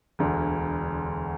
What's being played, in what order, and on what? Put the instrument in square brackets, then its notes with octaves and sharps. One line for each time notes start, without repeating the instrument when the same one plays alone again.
[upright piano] E1 D2 D3